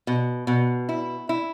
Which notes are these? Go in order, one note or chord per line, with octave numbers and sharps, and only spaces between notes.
B2
B2
E4
E4